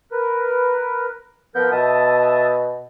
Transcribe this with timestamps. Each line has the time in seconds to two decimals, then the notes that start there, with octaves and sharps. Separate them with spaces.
0.12 A#4 B4
1.55 F3 B3 A#4 G6
1.72 B2 E5 A5 D#6